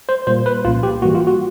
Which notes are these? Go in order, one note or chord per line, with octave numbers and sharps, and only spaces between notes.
C5
A#2 G3 A#3 C5
B4
C2 A#2 F3 A#3 C#4 F4
G4
G#2 E3 G3 A#3 F#4
F4
F#4